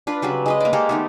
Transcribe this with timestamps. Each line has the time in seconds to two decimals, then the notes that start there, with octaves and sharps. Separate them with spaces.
0.07 D4 F4 B4
0.22 C#3 F#3 G3 B4
0.46 G#3 B4 D#5
0.60 A#3 D5
0.73 G#3 A#3 G4 A4
0.89 D#3 A3 B3